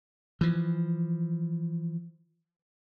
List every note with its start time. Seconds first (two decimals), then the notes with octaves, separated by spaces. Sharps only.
0.41 E3 F3